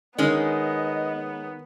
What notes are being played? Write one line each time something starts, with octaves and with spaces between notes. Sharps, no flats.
D#3 G#3 B3 C#4 D#4 D#5